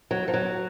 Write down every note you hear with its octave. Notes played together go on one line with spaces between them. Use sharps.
F#3
F3
F#3